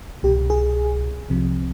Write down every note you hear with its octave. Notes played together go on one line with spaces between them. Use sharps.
C2 B2 G4
G#4
C2 C3 F3